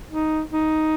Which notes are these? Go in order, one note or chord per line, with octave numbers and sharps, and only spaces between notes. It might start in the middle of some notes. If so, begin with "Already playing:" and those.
D#4
D#4